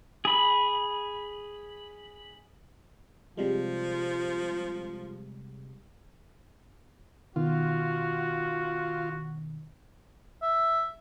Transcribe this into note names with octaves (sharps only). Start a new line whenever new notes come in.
G#4 B5
C3 F3 G3 G#3
B2 D#3 F4 F#4
E5